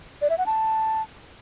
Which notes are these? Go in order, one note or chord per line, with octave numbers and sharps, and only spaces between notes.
D5
E5
F#5
A5